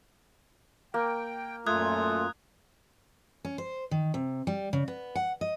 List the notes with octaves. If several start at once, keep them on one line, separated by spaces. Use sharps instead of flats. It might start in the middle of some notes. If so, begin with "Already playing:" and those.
A#3 G5
F#2 A#2 A3 F4 D#6 F#6 G#6
C#4
C5
D#3
C3
G3
C#3
B3
F#5
D#5